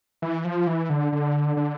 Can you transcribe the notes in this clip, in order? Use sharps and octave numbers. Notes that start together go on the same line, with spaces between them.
E3
F3
E3
D3
D3
D3